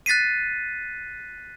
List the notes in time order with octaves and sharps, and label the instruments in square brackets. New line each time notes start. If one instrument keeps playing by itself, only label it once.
[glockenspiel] F#6 A6 B6 C7 D#7